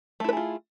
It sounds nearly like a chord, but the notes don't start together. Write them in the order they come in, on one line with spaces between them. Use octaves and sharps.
A3 E4 B4 G#4 F4